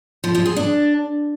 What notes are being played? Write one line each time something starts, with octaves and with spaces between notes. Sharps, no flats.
F3
F3
G#4
D4